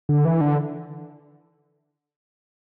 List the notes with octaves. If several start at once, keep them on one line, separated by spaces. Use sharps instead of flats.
D3
E3
D3